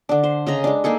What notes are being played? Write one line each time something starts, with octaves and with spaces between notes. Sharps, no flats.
D3 D4
C5
C#3 D#5 A#5
G#3 D4
A#3 D#4 G#4 A4